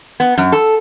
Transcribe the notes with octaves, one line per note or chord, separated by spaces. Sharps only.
B3
F#2
A4